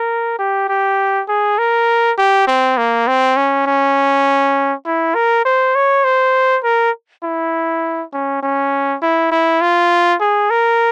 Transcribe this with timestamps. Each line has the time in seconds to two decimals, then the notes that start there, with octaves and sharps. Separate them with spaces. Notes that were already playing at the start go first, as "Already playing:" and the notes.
Already playing: A#4
0.39 G4
0.69 G4
1.29 G#4
1.58 A#4
2.18 G4
2.47 C4
2.77 A#3
3.07 C4
3.37 C#4
3.66 C#4
4.86 E4
5.15 A#4
5.45 C5
5.75 C#5
6.04 C5
6.64 A#4
7.23 E4
8.13 C#4
8.43 C#4
9.02 E4
9.31 E4
9.61 F4
10.21 G#4
10.50 A#4